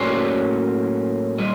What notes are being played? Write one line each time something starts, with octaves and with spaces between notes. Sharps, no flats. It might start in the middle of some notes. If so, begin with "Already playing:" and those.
Already playing: A2 F#3 A#3 C#4 C5 D5
A#2 G3 D#5